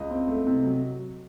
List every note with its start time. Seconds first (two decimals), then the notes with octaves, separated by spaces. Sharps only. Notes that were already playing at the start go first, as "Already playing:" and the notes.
Already playing: C#2 D#5
0.10 C4
0.28 A3
0.47 C3
0.64 F#3